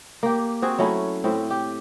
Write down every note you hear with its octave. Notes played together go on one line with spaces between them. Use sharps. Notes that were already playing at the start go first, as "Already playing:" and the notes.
A#3 G4
C4 F#4 G#4
F#3 A3 C#4 E4
A2 C4
G4